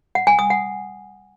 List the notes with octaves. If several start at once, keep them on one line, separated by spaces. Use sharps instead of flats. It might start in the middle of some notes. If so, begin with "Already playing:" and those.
F#5
G#5
D#6
F#5